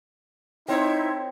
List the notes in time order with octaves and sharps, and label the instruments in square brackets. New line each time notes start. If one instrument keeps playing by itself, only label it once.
[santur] C4 [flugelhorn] D#4 [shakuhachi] E4 [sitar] A#4 C5 C#5